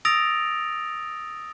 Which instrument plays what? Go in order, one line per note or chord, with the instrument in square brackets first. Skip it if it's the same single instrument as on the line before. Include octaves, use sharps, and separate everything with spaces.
[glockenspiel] D#6 E6 A6 A#6 D7 F7